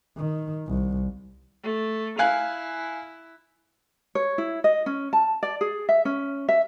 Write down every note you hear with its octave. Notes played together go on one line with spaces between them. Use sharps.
D#3
C2
A3
E4 F5 G#5 F#6
C#5
E4
D#5
C#4
A5
D5
G#4
E5
C#4
E5